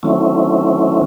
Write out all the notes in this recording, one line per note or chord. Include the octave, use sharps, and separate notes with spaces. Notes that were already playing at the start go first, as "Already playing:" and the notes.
D#3 F#3 A3 C4 C#4 E4